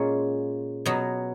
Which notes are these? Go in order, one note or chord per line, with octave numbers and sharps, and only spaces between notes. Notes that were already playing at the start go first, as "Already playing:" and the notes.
Already playing: A#2 G#3 C#4 F4
B2 F#3 B3